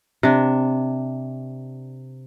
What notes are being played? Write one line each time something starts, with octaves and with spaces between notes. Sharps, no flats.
C3 D4